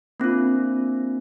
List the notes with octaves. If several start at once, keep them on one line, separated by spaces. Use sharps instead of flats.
A#3 C4 D4 F4